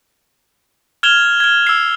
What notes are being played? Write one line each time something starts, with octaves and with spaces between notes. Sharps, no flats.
F6 G#6 E7 F7 G7
F6 G#6
E6 C7